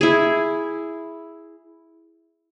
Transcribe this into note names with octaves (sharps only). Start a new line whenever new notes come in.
E4 G#4